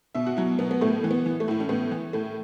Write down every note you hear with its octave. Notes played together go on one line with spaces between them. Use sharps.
B2 E5
F#4
F#3 E4
B2 B3
B3
A2 A3
E3
B3
E3
A3
A2 E4
C#4
A2 B3
E3
A2 A3